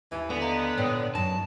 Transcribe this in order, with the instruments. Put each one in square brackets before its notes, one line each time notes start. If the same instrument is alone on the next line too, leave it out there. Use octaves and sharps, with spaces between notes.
[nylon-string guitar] D#2 [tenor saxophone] E3
[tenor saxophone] D3 [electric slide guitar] B3 [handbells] G#5
[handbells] D#5 F5 A#5
[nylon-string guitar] A#2 [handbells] B4 C#5 G5
[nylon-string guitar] F#2 D#3 [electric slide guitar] A5